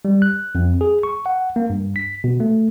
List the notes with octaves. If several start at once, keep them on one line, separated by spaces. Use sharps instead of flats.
G3
F#6
F2
G#4
C#6
F#5
A#3
G2
B6
B2
A3